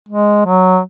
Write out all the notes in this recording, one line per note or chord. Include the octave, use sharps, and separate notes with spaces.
G#3
F#3